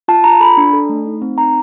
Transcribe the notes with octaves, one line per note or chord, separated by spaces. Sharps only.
F4 A5
F4 A#5
A4 B5
D4
A4
A3
D#4
C4
D#4 A#5